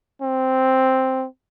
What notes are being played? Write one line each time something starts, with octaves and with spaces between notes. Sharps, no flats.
C4